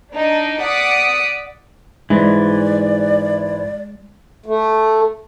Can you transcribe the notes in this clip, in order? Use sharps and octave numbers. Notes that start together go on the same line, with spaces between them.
D4 D#4
D5 F#5 D6 D#6 B6 C#7
G#2 E3 G#3 D5
A3